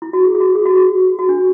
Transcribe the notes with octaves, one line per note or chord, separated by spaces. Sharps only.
E4
F#4
G#4
G#4
F#4
G#4
F#4
F#4
F#4
D4